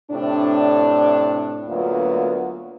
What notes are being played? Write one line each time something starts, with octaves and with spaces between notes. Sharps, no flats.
A2 C3 D4
D2 F#3 A#3 B3 F4